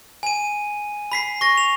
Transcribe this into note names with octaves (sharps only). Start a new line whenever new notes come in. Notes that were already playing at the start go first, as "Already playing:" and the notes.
G#5 D#7
B5 B6 C7
C#6 A#6
F7